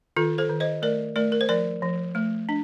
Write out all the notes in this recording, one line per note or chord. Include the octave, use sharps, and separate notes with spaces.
D#3 F4 A4
A4 C5
D#3
C5 D#5
A3 A#4 D5
A3 A#4 D5
A#4
C5
F3 A#4 D5
F3
A3
D4